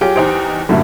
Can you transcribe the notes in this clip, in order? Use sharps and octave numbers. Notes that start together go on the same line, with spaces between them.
F#3 F4 G4 G#4
E2 D#4 C5 D7
F#2 A2 D3 G3 E4